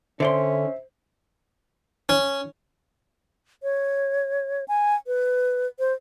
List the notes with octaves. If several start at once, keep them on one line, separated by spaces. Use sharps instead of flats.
D3 C#4 C5 D5 E5 C6
C#4
C#5
G#5
B4
C5